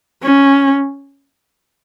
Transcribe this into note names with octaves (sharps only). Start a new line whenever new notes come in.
C#4